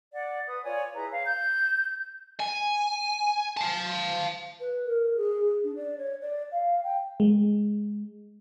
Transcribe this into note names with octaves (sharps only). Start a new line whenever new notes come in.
D5 F#5
B4 D#6
F4 C#5 D5 G#5
E4 G#4 B4 A#5
C#5 F5
G6
G#5
F5 A5
B4
A#4
G#4
D4
D5
C#5
D5
F5
G5
G#3